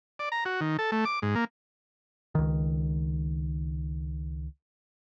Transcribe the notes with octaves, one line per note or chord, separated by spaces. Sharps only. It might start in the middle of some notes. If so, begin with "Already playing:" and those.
D5
A#5
F#4
D#3
A4
A3
D6
G#2
A#3
C#2 D#3